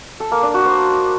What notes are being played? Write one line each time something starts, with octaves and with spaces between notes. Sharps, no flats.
A4
A#3
D4
F#4
C5